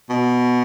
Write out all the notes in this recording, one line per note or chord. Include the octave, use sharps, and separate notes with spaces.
B2